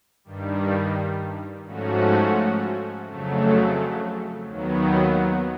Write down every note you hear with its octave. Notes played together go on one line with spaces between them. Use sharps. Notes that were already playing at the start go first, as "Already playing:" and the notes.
G2 D#3 G3
G#2 F3 A3 C#4 F#4
F2 C#3 F#3 A3
D#2 D#3 F#3 B3